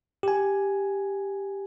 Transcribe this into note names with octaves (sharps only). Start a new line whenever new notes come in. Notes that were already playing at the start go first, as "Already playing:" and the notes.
G4 G#5